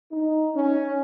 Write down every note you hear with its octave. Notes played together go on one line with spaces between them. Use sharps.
D#4
C#4